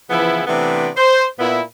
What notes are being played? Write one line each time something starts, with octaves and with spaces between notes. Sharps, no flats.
C#3 E3 F3 B3 E4
C3 E3 A3 B3 C4 D4
C5
A#2 B3 E4